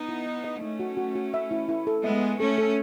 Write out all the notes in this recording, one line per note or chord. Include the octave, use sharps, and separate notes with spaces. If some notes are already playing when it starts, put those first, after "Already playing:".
Already playing: B3 D#4
E4
B4
D#5
A3 C#4 D#4
F#4
F#4
F#4
E5
E4
E4
A4
G#3 B3 E5
G#5
A3 C#4 A4
A4